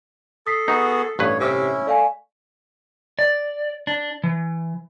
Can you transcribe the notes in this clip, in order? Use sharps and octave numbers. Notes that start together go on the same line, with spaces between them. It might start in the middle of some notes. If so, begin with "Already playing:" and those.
A4 D#6 B6 C7
B3 D#4 F#4 G#4
A1 G2 B4 C#5
C3 C#4 E4
A3 D5 F5 G#5
D5
D4
E3